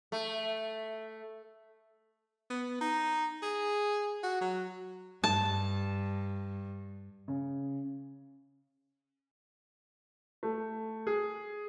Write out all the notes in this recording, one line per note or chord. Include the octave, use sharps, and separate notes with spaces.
A3
B3
D#4
G#4
F#4
F#3
G2 A5
C#3
A3
G#4